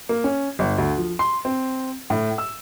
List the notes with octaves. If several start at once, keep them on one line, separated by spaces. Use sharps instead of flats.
A#3
C#4
G1
D2
F3
C6
C4
A2
E6